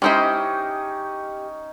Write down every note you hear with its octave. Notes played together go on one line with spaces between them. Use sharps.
G#3 C#4 D#4 E4 G4 C5 D#5 G5